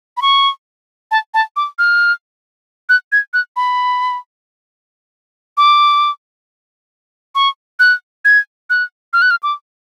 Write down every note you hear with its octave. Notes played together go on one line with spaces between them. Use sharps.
B5
C#6
A5
A5
D6
F6
F#6
G#6
F#6
B5
D6
C#6
F#6
G#6
F#6
F6
F#6
F6
D6